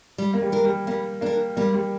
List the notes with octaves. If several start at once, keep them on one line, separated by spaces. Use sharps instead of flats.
G3
A#3
G3
D4 A#4
G3
G3 A#3
A#3 D4 A#4
G3 A#3
G3